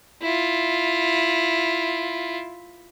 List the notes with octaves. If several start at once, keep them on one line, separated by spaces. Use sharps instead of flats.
E4 F4